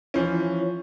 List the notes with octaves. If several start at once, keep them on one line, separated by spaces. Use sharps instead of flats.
E3 F3 C#4